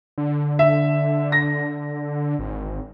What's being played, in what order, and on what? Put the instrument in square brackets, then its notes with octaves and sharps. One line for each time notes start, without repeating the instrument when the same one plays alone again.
[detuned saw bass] D3
[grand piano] E5
A#6
[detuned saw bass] G#1